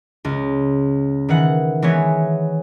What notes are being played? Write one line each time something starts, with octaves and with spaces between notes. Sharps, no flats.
C#2
D#3 E3 F#5
E3 G#3 B3 C#5